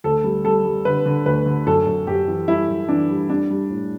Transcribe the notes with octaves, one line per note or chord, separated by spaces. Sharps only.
D2 A4
G3
G3 A4
G3
D3 B4
D3
D2 B4
D3
F#2 A4
F#2
F#2 G4
E3
G3 E4
F#2
E3 D4
G3
G3 D4
G3
A2